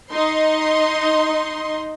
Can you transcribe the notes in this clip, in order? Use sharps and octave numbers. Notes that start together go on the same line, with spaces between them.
D#4 D#5 C6